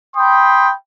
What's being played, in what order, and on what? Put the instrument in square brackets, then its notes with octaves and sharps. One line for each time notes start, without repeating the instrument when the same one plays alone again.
[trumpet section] G5 B5 C6 D#6